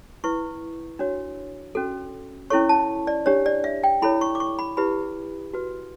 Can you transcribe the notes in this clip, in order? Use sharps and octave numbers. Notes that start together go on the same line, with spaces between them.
E4 B4 C#6
D4 F#4 C#5
C#4 F#4 A4
C#4 E4 A4 C#5 C#6
A5
D5
D4 G4 C#5
D5
E5
G5
E4 A4 C#5 B5
C#6
D6
C#6
B5
E4 G4 B4 B5
F#4 B4